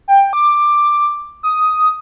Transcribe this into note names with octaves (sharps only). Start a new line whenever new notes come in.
G5
D6
D#6